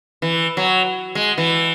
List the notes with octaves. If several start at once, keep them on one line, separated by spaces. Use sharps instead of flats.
E3
F#3
G#3
E3